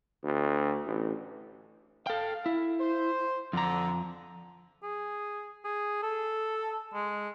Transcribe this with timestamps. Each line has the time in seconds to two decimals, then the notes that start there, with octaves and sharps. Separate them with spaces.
0.24 D2
0.87 A1
2.07 A4 F5 G5
2.46 E4
2.80 C5
3.53 F2 D3 A#5
4.83 G#4
5.64 G#4
6.03 A4
6.94 G#3